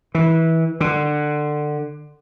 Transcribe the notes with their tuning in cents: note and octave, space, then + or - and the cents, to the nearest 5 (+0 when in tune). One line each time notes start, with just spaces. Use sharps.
E3 -20
D3 +20